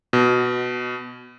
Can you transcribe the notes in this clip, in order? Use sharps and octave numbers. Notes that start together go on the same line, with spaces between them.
B2